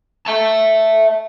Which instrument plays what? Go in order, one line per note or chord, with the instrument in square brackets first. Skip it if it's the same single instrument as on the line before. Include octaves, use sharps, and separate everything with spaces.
[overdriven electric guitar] E5 A5